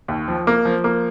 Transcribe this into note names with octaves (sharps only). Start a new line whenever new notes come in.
D#2
F3
A#3
F3
A#3